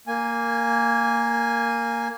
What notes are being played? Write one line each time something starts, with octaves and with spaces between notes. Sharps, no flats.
A#3 G#5